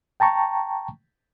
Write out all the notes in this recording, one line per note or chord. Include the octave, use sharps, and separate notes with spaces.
G5 A5 A#5 C#6